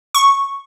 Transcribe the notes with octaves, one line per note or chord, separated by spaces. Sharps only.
C#6